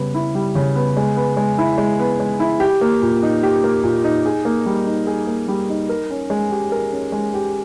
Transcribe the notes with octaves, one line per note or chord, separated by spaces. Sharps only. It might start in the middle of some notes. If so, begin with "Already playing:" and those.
Already playing: C#3 G3 B3
E4
G3
C#3
B3
G#3
B3
G#3
E4
G#3
B3
G#3
E4
G4
A#3
A#2
D#4
G4
A#3
A#2
D#4
G#4
A#3
G3
D#4
G#4
A#3
G3
D#4
A#4
C#4
G#3
G4
A#4
C#4
G#3
G4